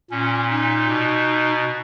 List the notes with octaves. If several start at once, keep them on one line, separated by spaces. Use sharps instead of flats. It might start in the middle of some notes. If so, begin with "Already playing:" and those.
A#2 C#4
D#4
B2